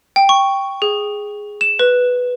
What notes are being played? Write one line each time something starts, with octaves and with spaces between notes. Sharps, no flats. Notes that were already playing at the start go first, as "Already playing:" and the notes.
G5
C#6
G#4
E7
B4